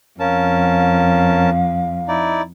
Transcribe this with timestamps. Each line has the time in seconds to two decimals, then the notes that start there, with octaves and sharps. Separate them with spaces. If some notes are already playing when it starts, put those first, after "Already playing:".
0.20 F2 C#4 A#4 F5 A5
2.08 D#4 E4 D5